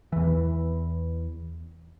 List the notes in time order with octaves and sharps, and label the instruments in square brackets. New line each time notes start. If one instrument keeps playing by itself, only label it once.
[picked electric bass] E2 E3